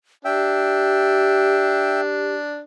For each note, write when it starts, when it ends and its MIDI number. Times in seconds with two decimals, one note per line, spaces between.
0.25 2.62 62
0.25 2.34 67
0.25 2.01 76
0.25 2.01 79